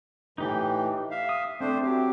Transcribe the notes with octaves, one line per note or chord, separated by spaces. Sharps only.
A2 E3 D#4 G4 G5
E5 F5
D#6
A3 C4 D4 C5
F#3 G4